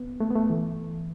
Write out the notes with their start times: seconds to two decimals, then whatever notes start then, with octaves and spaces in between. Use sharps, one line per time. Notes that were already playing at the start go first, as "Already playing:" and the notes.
Already playing: B3
0.20 A3
0.30 B3
0.35 A3
0.50 E3